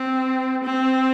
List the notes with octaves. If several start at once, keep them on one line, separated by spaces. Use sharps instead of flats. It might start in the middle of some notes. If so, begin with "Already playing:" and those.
Already playing: C4
C4